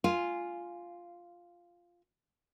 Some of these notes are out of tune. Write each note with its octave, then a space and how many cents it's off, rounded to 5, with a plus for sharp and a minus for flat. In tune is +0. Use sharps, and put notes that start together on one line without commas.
F4 +0 G#5 +0